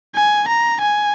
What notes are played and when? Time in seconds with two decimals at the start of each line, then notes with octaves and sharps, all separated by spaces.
0.15 G#5
0.48 A#5
0.80 G#5